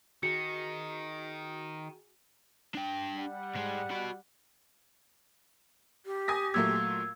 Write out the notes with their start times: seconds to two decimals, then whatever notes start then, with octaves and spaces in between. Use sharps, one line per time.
0.23 D#3 F#4 G#4 C#7
2.75 D4 G5
3.16 G3 F#5
3.56 G#2 G#3
3.91 F#4 B5
6.06 G4
6.28 G#5 D#6 A#6
6.54 A#2 F#3 A3 E6 G#6